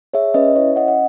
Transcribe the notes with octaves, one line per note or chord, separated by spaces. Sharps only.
G#4 C#5 E5
C#4 B4 D#5
E4 C#5 E5
C#4 D#5 F#5
F#5